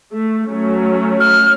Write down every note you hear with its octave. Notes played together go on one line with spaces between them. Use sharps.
A3
F#3 A3 C#4
F6